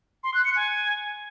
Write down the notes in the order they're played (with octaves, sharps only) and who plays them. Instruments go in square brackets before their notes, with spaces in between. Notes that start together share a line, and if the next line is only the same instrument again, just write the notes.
[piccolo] C6
F#6
C#7
G#5